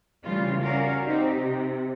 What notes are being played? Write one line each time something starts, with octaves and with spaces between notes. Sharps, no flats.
C#3 E3 G3 A3 F4
C#4 F#4 A#4 D5 F5
C4 D#4 G4
C3